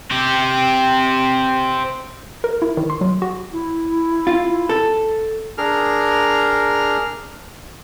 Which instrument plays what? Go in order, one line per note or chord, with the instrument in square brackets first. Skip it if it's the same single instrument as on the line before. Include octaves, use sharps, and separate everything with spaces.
[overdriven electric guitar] C4 G4
[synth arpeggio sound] A#4
E4
D#3
C6
F#3
F#4
[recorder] E4
[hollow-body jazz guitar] F4
A4
[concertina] D4 G#4 A#4 F6